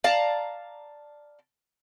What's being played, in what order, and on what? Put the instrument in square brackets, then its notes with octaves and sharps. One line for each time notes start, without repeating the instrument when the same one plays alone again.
[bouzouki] D5 F5 A5 A#5